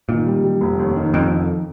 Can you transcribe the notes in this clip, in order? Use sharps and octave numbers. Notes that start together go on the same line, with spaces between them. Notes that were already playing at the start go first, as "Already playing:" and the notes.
A#2 D#3
G3
G3
F1
D#2
D#3
F1 F2
D#3